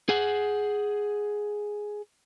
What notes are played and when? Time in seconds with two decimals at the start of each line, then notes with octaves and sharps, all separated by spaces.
0.09 G#4 F#5